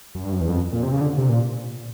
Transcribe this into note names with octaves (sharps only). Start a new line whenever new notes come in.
F#2
G2
F#2
E2
F2
A#2
C3
C#3
D3
C3
A#2